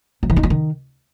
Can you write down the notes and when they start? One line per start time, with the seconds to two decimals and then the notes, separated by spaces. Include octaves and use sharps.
0.23 F#3
0.30 E3
0.37 D#4
0.43 F3
0.50 D#3